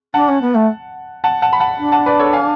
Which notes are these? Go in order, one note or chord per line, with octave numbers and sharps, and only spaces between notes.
D4 F#5 A5
C#4
B3
A3
F#5 A5
F#5 A5
B5
F#5 A5
D4
F#5 A5
B4 D5
A4 C#5
F5 G#5